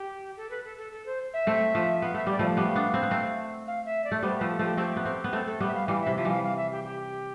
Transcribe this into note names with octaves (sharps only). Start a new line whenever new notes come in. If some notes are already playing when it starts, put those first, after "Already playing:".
Already playing: G4
A4
B4
A4
A4
A4
C5
E5
A3 C4
F3 A3
B3 F5
A3 E5
G3 D5
F3 A3 F5
G3 B3
B3 D4
C4
B3
A3 C4
F5
E5
D5
A3
G3 B3 C5
F3 A3 B4
A4
F3 A3 G4
A3 C4 G4
B3
A3 C4
B3
A3 C4 A4
A4
G3 B3
E5
F5
E3 G3 F5
C3 E5
F3 E5
E3 G3 F5
F5
E5
G4
G4